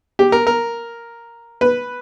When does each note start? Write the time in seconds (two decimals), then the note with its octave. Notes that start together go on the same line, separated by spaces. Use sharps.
0.19 G4
0.32 A#4
0.47 A#4
1.61 B4